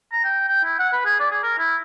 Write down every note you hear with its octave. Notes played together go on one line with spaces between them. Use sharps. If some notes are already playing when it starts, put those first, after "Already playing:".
A#5
G5
G5
E4
F#5
B4
G#4
D5
G#4
A#4
E4